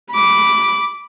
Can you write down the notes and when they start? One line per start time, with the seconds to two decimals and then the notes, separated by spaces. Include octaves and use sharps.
0.13 B5 D6